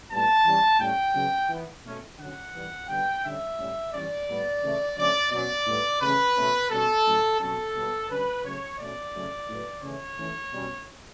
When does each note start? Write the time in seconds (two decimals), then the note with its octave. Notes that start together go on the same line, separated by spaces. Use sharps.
0.11 A2 G3 B3 A5
0.45 E3 G3 C#4
0.80 A2 G3 C#4 G5
1.14 C#3 F#3 B3
1.50 E3 B3
1.84 B2 A3 C#4
2.19 D3 F#3 C#4 F#5
2.54 E3 G3 B3
2.88 D3 G3 B3 G5
3.24 D3 G3 C#4 E5
3.58 A2 G3 C#4
3.92 E3 G3 C#4 D5
4.27 A2 G3 B3
4.62 C#3 E3 A3
4.96 D3 F#3 A3 C#4 D5
5.31 B2 F#3 C#4 D5
5.66 A2 G3 B3
6.01 C#3 E3 A3 C#4 B4
6.36 B2 A3 C#4
6.70 B2 G3 C#4 A4
7.06 A2 F#3 C#4
7.40 B2 F#3 C#4 A4
7.75 B2 G3 B3
8.09 D3 G3 C#4 B4
8.44 C#3 F#3 A3 C#4 C#5
8.79 B2 A3 C#4 D5
9.14 C#3 F#3 A3 C#4
9.48 A2 F#3 B3
9.82 C#3 E3 A3 C#4 C#5
10.18 E3 A3 C#4
10.53 B2 G3 C#4